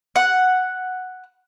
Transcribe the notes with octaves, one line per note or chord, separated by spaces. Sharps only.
F#5